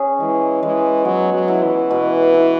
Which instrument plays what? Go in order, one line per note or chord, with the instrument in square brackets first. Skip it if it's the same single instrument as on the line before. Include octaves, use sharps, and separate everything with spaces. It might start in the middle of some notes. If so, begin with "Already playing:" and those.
Already playing: [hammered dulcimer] C#4 G#4
[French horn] E3 [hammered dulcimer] G#3
[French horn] E3 [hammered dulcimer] G#3
[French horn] F#3 [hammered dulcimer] B3
[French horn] F#3
[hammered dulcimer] E4
[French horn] E3
[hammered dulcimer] B2
E4